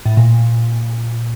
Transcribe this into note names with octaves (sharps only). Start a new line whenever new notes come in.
A2
A#2